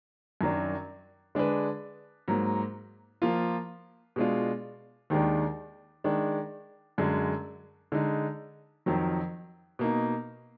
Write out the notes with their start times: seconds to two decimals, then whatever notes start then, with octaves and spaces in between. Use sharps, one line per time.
0.41 F#2 D#3 F#3 D4
1.35 D3 G#3 D4 G#4 B4
2.28 G#2 F#3 A#3
3.22 F3 A#3 F4
4.16 B2 G#3 D4 F4
5.10 D#2 D#3 G#3 D4
6.04 D#3 G#3 D4
6.98 F#2 D3 G#3
7.92 D3 G#3 D#4
8.86 F2 D#3 F#3
9.79 B2 A#3 D#4